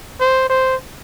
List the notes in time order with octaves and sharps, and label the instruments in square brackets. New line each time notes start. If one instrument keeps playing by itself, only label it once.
[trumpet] C5
C5